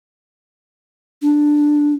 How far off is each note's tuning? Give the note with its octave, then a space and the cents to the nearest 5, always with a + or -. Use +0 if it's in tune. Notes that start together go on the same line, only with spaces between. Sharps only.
D4 +5